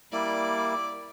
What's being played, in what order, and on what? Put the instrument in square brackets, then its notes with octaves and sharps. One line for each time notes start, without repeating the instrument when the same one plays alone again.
[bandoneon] G3 A#3 E4 [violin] D5